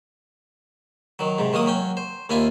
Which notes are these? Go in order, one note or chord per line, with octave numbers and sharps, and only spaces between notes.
D#3 F#3
G#2 C3
D#3 F#3 A#3 D#6
F#3 C#4 G5
C5
D#2 A#3 E4 F4 G#5